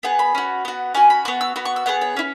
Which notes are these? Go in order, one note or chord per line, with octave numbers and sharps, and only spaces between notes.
B3 G#4 F#5
B5
C#4 F#4
B3 F#4
C#4 F#4 G#5
B5
B3 F#4 C#6
E6
B3 F#4 B5
C#6
E6
B3 E4 G#4 F#5
C#5
C#4 E4